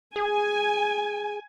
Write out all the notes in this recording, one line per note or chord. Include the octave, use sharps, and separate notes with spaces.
G#4 G#5